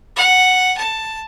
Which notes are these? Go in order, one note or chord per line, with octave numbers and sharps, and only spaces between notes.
F#5
A5